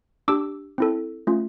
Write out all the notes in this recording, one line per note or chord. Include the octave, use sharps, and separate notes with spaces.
D4 G4 D6 E6
C4 E4 A4
A3 C#4 F4